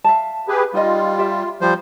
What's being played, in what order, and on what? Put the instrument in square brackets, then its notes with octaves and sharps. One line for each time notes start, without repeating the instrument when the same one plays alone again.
[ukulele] E5 F5 A5
[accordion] G4 G#4 B4
[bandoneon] G3 [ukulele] D#4 D#5 [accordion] F4
[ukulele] G4 E5
[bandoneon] F3 G3 C5